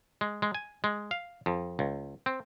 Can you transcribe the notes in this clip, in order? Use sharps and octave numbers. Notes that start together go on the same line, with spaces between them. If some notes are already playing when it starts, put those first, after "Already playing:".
G#3
G#3
G#5
G#3
F5
F2
C#2
C4